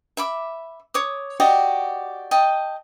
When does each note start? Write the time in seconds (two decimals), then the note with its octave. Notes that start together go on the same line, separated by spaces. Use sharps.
0.17 E5 B5 D6
0.94 C#5 D6 D#6
1.40 F#4 G4 D5 D#5
2.31 D#5 G5 A5